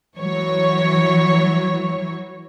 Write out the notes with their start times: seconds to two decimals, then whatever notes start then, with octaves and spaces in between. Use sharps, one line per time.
0.17 E3 F#3 C#5